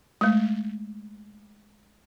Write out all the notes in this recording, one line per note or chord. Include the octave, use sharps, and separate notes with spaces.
G#3 A3